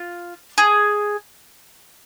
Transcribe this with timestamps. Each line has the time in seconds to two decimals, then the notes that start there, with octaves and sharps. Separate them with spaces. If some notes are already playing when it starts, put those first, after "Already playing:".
Already playing: F4
0.58 G#4